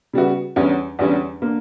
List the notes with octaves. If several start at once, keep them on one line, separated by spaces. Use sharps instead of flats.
C#3 G3 B3 F#4
E2 D3 G3 C#4
E2 D3 G3 C#4
D3 A#3